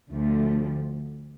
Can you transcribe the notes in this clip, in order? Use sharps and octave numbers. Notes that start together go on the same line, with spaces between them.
D2 D3 F3 A3